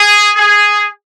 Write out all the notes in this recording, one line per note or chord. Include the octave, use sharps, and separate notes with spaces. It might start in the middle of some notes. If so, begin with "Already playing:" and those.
Already playing: G#4
G#4